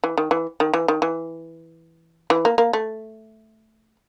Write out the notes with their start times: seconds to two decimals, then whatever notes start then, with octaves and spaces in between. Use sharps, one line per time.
0.04 E3
0.18 D#3
0.31 E3
0.60 D#3
0.74 E3
0.88 D#3
1.02 E3
2.30 E3
2.45 A#3
2.58 A#3
2.73 A3